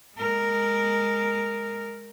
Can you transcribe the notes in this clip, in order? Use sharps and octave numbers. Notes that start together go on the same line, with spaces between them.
G#3 A#4